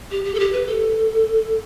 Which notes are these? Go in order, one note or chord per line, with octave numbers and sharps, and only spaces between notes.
G4
G4
A4
G4
B4
A4